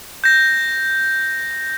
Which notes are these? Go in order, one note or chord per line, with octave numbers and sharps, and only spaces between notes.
G6 A#6